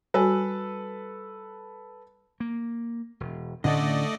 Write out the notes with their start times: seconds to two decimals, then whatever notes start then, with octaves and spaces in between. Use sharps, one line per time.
0.14 G3 F#4 A4 B4 G#5
2.40 A#3
3.20 E1
3.64 A2 D3 A3 C4 C#4 D5 D#5